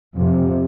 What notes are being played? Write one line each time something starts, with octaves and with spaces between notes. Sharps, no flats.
F2 C3 F3